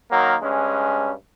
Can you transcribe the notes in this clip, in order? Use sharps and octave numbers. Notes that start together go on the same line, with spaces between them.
D#3 F#3 A#3
G2 G#3 C#4